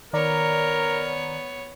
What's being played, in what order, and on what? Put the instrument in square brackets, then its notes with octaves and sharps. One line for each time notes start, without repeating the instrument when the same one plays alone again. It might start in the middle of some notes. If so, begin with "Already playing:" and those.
[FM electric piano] D#3 D5 A#5 [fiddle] B3 C#5 [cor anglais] A#4